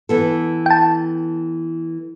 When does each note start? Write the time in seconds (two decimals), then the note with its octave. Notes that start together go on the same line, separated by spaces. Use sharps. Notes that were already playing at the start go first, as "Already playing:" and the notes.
0.09 E3 B3 A4
0.66 G5 A5